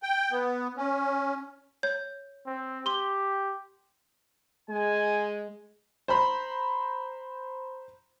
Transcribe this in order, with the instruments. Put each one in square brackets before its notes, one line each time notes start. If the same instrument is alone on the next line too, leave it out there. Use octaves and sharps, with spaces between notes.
[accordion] G5
B3
C#4
[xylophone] C#5 G6
[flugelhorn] C4
[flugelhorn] G4 [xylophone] C6 G7
[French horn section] G#3 [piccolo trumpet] G#5
[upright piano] C5 A#5 B5